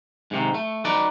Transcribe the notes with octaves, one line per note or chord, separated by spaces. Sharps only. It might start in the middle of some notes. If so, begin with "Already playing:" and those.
G#2 C3 D#3
A3
D#4 F#4 B4 D5